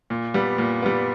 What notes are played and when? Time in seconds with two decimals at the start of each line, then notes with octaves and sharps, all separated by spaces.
0.10 A#2
0.34 G3 B3
0.58 A#2
0.82 G3 B3